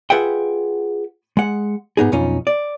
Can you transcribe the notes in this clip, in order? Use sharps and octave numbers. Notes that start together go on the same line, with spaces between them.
F4 G#4 B4 E5 F#5 G5
G#3 F#5
G#2 B3 D#4 G#4
B1 F2 C#4 D#4 F4
D5